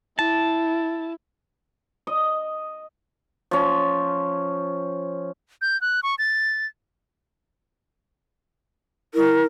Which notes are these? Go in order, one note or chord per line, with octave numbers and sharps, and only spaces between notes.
E4 A5
D#5
F3 C#4
G6
F#6
C#6
A6
E4 A#4